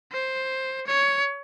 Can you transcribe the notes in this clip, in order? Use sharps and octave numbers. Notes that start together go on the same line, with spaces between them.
C5
C#5